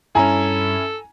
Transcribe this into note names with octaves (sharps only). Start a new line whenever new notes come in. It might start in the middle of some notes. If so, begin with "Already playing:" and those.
G2 C#4 E4 A4 G#5 A#5